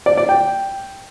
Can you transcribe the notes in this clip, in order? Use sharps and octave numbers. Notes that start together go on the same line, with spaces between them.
D5
D5
G5